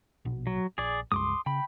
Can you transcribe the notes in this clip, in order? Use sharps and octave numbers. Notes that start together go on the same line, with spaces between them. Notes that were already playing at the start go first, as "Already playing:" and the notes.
A#1 B2
F#3
A#1 G#4 D5
C#2 G2 G#3 C6 D6 D#6
C#3 G5 B5